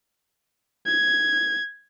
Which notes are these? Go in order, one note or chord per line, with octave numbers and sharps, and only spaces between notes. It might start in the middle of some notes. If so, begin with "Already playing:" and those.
G#6